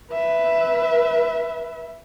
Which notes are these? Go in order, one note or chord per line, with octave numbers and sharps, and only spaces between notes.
B4 E5